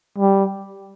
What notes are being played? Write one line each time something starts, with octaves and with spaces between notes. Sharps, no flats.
G3